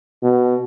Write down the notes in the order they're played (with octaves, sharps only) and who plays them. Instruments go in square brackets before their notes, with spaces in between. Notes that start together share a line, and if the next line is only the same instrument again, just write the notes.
[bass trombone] B2